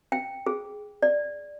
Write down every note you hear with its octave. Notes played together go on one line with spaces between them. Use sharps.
G5
G#4
D5